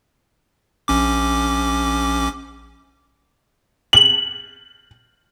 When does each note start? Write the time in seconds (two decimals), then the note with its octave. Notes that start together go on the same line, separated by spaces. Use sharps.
0.88 A#1 C#4 D6
3.93 F#7